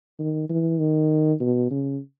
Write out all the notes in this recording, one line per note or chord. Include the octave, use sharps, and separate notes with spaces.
D#3
E3
D#3
B2
C#3